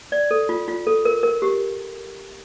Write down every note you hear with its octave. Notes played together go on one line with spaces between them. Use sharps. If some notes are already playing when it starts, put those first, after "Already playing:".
D5
A4
F4
F4
A4
A#4
A#4
G4